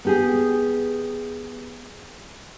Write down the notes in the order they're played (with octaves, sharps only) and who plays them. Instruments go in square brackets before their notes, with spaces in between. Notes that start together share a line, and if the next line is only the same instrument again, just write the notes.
[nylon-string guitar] B3 G4 G#4